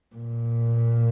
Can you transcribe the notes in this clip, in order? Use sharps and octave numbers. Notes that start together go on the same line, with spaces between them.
A#2